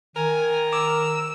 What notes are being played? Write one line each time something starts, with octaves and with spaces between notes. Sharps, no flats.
D#3 A#4 G#5
D6 E6